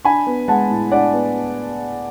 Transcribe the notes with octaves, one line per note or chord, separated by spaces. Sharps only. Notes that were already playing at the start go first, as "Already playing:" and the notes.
D4 G#5 B5
B3
G#3 F#5 A5
A2
D4 D5 F#5
B3